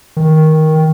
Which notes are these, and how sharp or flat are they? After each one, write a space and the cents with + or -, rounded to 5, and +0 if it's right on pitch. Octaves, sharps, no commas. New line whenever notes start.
D#3 +10